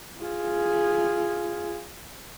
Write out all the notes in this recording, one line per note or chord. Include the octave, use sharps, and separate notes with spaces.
F4 G#4